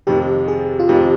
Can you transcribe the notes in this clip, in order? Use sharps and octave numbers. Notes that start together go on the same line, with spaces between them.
F2 C3 D#3 G4
G#4
F4
F2 C3 D#3 G4